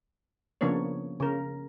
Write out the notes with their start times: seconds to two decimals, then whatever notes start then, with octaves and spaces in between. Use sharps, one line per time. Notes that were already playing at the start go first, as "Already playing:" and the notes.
0.61 C#3 F3 A#3 B3 D4 C#5
1.20 C#3 A#4